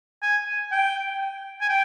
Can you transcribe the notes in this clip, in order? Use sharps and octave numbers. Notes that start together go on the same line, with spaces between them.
G#5
G5
G#5
G5